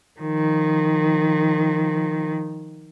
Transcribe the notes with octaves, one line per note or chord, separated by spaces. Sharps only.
D#3 F3